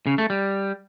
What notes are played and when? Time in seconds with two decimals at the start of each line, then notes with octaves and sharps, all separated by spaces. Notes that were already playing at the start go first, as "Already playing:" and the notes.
0.07 C#3
0.18 A3
0.30 G3